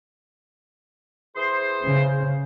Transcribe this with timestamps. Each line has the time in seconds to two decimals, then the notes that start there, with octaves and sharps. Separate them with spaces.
1.36 E3 G#4 C5
1.82 C#3